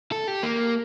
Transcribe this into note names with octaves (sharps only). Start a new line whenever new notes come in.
A4
G4
A#3